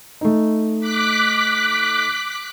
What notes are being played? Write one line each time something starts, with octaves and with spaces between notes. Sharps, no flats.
A3 D#4
D6 F#6 B6